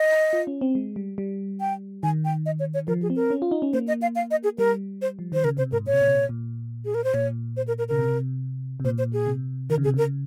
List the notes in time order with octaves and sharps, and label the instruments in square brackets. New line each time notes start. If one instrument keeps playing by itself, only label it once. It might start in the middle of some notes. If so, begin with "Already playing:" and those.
Already playing: [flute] D#5
[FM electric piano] F4
C#4
C4
G#3
G3
G3
[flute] G5
[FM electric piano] D#3 [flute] G#5
[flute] G5
D#5
C#5
C#5
[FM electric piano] F3 [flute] A#4
[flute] G#4
[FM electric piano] C4
[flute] A#4
[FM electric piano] C#4
F4
D#4
C#4
[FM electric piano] A#3 [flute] C5
[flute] D#5
F5
F5
D#5
G#4
[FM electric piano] G3 [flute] A#4
[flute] C5
[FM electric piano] F3
[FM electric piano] D#3 [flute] C5
[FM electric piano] C#3 [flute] A#4
[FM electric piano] C3 [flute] C5
[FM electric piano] G#2 [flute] A#4
[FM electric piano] A#2 [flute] C#5
[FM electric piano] C3
A#2
C3
A#2
A#2
[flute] G#4
A#4
C5
[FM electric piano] A#2 [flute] C#5
[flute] C5
A#4
A#4
[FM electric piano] C#3 [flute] A#4
[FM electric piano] C3
C3
[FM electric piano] A#2 [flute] C5
[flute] C5
G#4
[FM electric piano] C3
[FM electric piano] D#3 [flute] A#4
[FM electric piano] C#3
[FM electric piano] C3 [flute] G#4
[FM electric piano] C#3 [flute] A#4